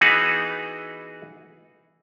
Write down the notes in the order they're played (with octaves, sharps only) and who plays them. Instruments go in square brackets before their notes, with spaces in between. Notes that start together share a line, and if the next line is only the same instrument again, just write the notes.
[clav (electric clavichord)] E3 B3 D#4 F#4 G#4